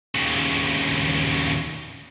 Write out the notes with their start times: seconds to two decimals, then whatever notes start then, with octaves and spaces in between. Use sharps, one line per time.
0.15 D#2 C#3